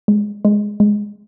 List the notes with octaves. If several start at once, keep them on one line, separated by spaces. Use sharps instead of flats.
G#3
G#3
G#3